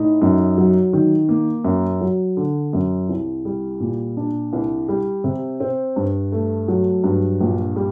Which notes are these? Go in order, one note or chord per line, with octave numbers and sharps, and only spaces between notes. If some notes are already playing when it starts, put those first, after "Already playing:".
Already playing: A2 D#4
F#2
F#3
D#3
A#3
F#2
F#3
D3
F#2
C2
G3
A#2
D4
C2
G3
C3
C4
G2
A3
F#3
G2
A#1
G3